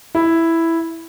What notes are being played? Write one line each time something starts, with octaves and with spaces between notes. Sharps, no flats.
E4